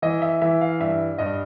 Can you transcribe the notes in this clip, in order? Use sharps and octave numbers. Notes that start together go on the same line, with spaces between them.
E3 D#5
E5
E3 E5
F5
G2 E5
G2 D#5